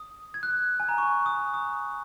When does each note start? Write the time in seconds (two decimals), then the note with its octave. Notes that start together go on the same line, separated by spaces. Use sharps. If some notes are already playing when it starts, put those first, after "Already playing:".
Already playing: D#6
0.34 G#6
0.43 F#6
0.80 G#5
0.89 A#5
0.98 C#6
1.26 D#6
1.54 D#6